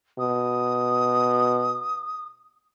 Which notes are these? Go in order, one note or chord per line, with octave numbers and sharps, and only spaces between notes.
B2 D#6